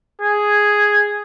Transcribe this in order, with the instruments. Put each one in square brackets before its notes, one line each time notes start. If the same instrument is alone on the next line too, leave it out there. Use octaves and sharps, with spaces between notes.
[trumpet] G#4